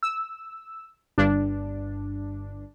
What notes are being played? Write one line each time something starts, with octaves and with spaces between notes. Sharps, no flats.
E6
G1 G2 D4